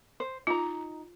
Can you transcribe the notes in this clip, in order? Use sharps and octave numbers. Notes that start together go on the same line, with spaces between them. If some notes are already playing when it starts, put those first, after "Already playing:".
C5
D#4 F4 A#5